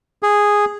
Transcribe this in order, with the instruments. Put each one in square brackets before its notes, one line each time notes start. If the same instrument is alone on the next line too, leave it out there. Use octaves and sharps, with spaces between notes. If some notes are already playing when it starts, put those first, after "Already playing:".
[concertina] G#4